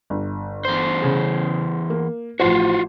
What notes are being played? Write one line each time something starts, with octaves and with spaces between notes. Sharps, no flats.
G1
E2 C5
C#3 G#4
A#3
A1 F3 F4 F#4 C5